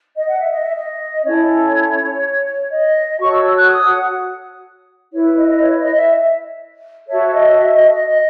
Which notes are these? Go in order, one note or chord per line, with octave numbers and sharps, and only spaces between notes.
D#5
F#5
E5
D#5
E5
D#5
C#4 E4 A4 C#5
D#5
F#4 A4 C#5 C#6
E6
E6
F#6
D#6
F#5
E4 B4 C#5
D#5
D#5
C#5
D#5
E5
F#4 A4 C#5 E5
C#5
D#5
E5
D#5
D#5
D#5